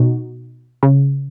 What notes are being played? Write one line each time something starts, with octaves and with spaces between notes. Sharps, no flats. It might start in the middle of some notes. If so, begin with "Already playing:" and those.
Already playing: B2 D#4 F#4
C#3